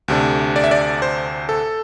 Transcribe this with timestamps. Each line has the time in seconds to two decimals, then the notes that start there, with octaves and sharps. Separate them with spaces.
0.08 D2 C3 A3 D4
0.56 D5
0.64 E5
0.71 D5
1.02 C5
1.49 A4